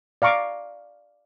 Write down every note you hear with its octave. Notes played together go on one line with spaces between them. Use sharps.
D5 F5 A#5 C#6 D6